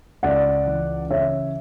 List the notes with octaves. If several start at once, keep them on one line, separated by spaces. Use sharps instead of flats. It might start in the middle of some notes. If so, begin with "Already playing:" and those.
C#2 D5 F#5
E3
C#3 C#5 E5